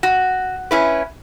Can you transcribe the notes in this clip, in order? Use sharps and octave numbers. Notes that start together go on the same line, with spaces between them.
F#4
C#4 E4 B4